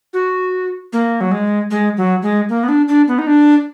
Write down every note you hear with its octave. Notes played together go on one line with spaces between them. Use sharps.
F#4
A#3
F#3
G#3
G#3
F#3
G#3
A#3
B3
D4
D4
B3
D#4
D4